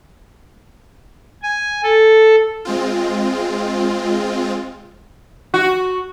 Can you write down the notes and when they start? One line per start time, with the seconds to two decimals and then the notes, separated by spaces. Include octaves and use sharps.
1.42 G#5
1.83 A4
2.65 G#3 C4 F4
5.54 F#4